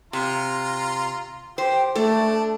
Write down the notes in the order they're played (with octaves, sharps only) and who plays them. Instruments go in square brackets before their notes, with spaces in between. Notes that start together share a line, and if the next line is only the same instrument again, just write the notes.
[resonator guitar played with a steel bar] C3 [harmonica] F4 A#5 C6
[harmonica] G4 [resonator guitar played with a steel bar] C5 [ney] G5
[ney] A3 [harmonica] D4 [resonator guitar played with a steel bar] A4